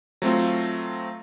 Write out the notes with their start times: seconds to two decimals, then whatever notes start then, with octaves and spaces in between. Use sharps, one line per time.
0.22 F#3 A3 C4 F4